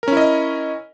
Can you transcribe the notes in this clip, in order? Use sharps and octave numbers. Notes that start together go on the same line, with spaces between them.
C#4 E4 A#4 D#5